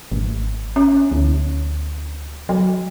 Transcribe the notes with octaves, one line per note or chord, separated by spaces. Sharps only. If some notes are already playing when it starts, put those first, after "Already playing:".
G#1
C#4
D2
F#3